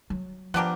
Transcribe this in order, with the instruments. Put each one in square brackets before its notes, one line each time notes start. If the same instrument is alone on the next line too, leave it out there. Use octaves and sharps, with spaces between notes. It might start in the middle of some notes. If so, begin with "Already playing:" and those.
[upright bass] F#3
[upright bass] F3 [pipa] B3 D4 G4 A#4